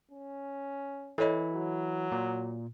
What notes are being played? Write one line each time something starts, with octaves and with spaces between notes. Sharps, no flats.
C#4
E3 E4 A4 C#5 D#5
F#3
A#2